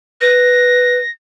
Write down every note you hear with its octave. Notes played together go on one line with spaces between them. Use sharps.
B4 A#6